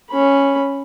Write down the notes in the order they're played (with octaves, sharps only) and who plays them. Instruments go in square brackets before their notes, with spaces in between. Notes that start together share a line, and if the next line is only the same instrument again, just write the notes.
[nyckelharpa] C#4 B5